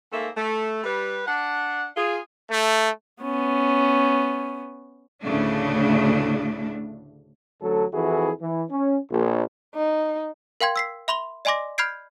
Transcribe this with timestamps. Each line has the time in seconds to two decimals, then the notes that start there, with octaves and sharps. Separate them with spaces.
0.12 G#2 A3 A#3 E5
0.35 A3
0.84 G3 B4
1.27 D4 F#5
1.96 F4 G#4
2.49 A3
3.23 B3 C#4
5.24 D2 A2 C#3 A3 D4
7.61 A1 D2 F#3 A4
7.93 F2 E3 E4 F#4 G#4 A4
8.40 E3
8.70 C#4
9.11 A#1
9.75 D#4
10.61 A#4 F5 G5 C6 G#6
10.76 E6 B6 C7
11.08 E5 B5 C6 F7 G7
11.45 D5 D#5 G#5 C6 D6 A#6
11.78 B5 F6 G6 G#6 C7 D7